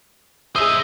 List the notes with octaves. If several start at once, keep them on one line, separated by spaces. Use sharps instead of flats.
G#4 C5 D#5 E5 D#6 D#7 G7